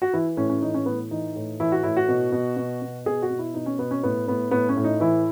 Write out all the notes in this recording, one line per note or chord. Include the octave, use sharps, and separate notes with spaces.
F#4
E3 E4
A2 C#4
C#4
E3 D#4
C#4
A2 B3
E3 D#4
A2
E3 E4
F#4
A2 E4
F#4
B2
B2
B2
B2
B2 G#4
F#4
B2
E4
B2 D#4
C#4
B2 B3
C#4
A2 B3
A2 B3
A2 B3
C#4
A2
D#4
E3 E4